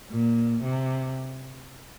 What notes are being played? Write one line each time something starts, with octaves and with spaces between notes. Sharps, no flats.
A#2
C3